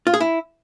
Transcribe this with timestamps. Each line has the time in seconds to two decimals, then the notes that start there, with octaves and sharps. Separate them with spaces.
0.07 F4
0.14 G#4
0.20 E4